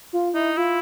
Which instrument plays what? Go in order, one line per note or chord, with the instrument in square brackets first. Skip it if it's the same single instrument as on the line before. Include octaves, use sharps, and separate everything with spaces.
[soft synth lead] F4
[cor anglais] D#4 [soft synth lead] E4
[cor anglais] E4 [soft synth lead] F4